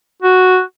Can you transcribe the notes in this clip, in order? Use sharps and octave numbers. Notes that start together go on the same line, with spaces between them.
F#4